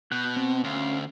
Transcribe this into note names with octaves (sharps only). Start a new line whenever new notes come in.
B2 F#6 G6
C4
D2 C#4 F5